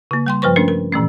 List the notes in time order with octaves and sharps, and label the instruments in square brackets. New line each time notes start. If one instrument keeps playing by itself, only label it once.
[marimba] C#3 A#3
G3 G5 C6
G2 F3 B4 C5 C#6
A3 C#4 D4 A#4
A#4
A#2 E3 A3 C#4